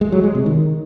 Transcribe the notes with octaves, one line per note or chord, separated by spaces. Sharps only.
G#3
F#3
G#3
C3
D#3